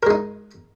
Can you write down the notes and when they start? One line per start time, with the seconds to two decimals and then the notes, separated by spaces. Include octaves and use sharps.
0.03 A#4
0.07 G#3
0.11 D#4